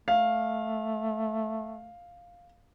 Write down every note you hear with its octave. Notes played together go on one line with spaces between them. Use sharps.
A3 F5